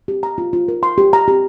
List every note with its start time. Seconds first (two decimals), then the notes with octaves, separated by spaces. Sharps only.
0.08 G4
0.23 A#5
0.38 F4
0.53 F4
0.68 A#4
0.83 C6
0.98 G4
1.13 A#5
1.28 G4